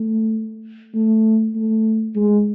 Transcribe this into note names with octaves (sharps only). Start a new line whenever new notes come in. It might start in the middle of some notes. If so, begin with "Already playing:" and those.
Already playing: A3
A3
A3
G#3